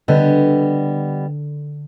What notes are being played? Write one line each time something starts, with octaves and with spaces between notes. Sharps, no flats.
D3 G3 B3 D#5